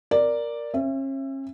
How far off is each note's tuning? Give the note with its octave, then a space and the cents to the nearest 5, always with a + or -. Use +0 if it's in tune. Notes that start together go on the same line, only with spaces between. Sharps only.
A#4 +0 D5 +0
C#4 -40 E5 +25